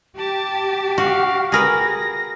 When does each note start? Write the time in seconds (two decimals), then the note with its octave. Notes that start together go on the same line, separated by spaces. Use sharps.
0.18 G4 A5
0.98 F#4 F5
1.52 G#4 A#4 B4 A#6